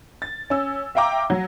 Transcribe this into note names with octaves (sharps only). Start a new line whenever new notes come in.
A6
C#4 E6
E5 F5 G5 A#5 D6
F#3